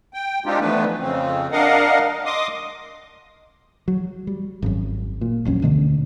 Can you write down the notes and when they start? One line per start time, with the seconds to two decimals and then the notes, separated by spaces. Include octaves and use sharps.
0.14 G5
0.46 G#3 C4 D4 D#4 F4 G4
0.60 E3 F3 A3 B3 D4 B4
0.99 F2 C#3 C4
1.52 D4 A#4 D#5 F5 F#5
2.26 D#5 C6 D6 D#6
3.88 F#3
4.27 G3
4.62 G#1 F#2
5.21 A#2
5.45 D#1 A#1 F#2 C#4
5.62 D2 B2 D3